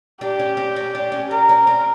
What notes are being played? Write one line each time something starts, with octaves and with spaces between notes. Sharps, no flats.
D4 G4
C#4
C4
C#4
D4
C#4
D4 A#4
C#4
C4